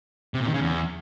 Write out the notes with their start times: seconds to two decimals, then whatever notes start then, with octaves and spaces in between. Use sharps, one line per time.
0.34 C3
0.41 A#2
0.47 D#3
0.54 C#3
0.61 E2